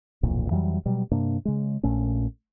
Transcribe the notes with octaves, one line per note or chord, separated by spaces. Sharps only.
D1 B1 F2 A#2
F2 E3 F#3 G3
B2 F#3 G3
G2 C3 A#3 D4
C#3 G#3
A#1 A#2 A3 C#4